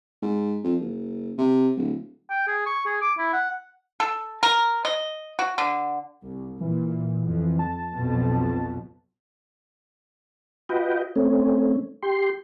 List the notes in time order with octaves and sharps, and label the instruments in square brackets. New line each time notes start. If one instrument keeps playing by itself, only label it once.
[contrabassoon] G#2
F2
F#1
C3
D1
[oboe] G5
G#4
C#6
G#4
D6
E4
F#5
[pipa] A4
A#4
D#5
F#4
D3
[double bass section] C2
[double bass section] A#2 [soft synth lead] E3
[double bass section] F2
[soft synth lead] A5
[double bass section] B1 F2 B2
[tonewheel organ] F4 F#4 B4 D#5 G5
A3 C4 C#4
G4 C6